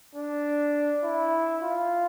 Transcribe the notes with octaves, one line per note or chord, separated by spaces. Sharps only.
D4
E4
F4